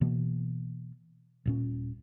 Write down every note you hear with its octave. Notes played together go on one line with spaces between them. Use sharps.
B2 E3 A#3
D#1 A#2 C#4